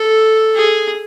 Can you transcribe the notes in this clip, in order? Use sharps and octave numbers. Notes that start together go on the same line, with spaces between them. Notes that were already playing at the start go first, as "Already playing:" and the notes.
Already playing: A4
G#4